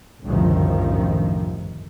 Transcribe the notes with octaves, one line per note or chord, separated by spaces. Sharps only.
G1 C2 F#2 A2 D#3 F3